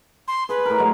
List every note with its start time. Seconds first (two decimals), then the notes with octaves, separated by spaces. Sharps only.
0.28 C6
0.49 G#4 B4
0.66 A2 A#4
0.79 F#3 G#3